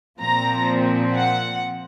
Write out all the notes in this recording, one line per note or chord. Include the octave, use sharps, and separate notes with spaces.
A#2 F3 C4 A#5
F#5